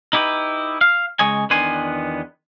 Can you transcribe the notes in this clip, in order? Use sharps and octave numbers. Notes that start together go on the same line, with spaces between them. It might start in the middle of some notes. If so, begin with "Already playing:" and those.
D#4 E4 G4 G#4 B4
F5
C#3 G#3 C#5 D#5 G#5
E2 D#3 B3 D4 G#5 C6